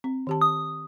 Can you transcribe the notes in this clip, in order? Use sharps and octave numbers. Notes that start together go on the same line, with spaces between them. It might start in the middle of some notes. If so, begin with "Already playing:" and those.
C4
D#3 G4 A5
D#6